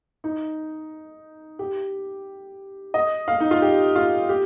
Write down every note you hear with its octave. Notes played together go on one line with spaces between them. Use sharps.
D#4
G4
D#5
F5
D#4
F4
G4
F4
G4